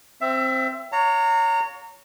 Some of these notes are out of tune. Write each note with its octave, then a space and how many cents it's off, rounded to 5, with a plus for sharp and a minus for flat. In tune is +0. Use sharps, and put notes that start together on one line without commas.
C4 +0 E5 +25
C#5 +20 F5 +45 A#5 -25